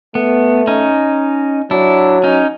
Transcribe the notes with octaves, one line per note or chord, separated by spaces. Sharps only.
A3 B3
C#4 D#4
F#3 D4 E4
C#4 D#4